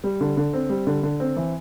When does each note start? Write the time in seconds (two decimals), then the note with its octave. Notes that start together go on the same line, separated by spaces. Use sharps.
0.04 G3
0.21 D3
0.37 D3
0.53 C4
0.69 G3
0.87 D3
1.03 D3
1.20 C4
1.37 E3